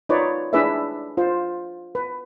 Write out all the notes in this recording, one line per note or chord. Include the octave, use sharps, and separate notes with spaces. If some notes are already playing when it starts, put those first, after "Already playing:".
D#4 F4 B4 C#5 D5
D4 E4 G#4 B4 D5 E5
F4 C5
B4